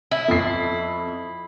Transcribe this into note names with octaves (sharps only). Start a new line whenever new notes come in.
E4
F2 C7